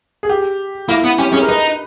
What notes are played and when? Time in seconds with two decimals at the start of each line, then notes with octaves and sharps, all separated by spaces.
0.23 G#4
0.29 G4
0.88 A#3 E4
1.04 B3
1.18 C#4 G4
1.33 C#4 G#4
1.41 A#4
1.48 D#4 B4